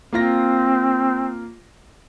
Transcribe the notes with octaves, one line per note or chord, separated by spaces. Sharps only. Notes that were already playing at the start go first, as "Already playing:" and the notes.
A#3 C4 F4 A#6